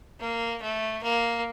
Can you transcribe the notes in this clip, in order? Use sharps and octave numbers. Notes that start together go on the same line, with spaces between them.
A#3
A3
A#3